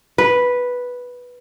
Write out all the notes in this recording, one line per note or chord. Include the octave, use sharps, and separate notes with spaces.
B4